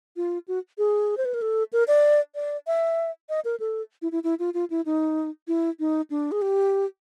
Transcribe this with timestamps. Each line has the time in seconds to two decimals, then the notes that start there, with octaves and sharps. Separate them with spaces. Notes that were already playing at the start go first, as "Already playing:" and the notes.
0.16 F4
0.48 F#4
0.78 G#4
1.17 C5
1.25 B4
1.34 A#4
1.42 A4
1.73 A#4
1.88 D5
2.35 D5
2.67 E5
3.29 D#5
3.45 A#4
3.60 A4
4.02 E4
4.12 E4
4.24 E4
4.39 F4
4.54 F4
4.70 E4
4.86 D#4
5.48 E4
5.80 D#4
6.10 D4
6.32 G#4
6.42 G4